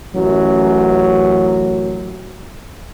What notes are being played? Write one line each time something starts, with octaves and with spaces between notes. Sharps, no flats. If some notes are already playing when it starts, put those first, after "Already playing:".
A1 F#2 F#3